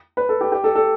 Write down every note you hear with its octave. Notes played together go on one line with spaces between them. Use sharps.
B4
A4
G4
G4
A4
A4